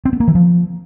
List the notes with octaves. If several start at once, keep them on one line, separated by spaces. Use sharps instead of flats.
C4
B3
A#3
E3
F3